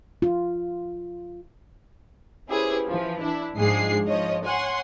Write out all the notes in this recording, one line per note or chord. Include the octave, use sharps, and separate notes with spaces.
F4
C#4 E4 G4 G#4 B4 C5
E3 F3
D4 E4
G#2 F3 G#3 D4 G#4 C7
F3 C#5 D#5
C#5 F#5 G#5 C6